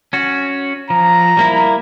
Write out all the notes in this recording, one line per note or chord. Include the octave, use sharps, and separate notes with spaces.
C#4 F#4
F3 A#5
G3 A#3 E4